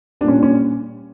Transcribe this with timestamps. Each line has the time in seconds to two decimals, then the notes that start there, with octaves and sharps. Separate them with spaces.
0.21 G3 D4
0.24 A#2 C#4
0.43 C#4